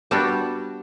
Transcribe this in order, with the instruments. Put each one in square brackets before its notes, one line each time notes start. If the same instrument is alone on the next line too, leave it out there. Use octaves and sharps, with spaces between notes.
[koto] G3 B3 D4 F#4 G4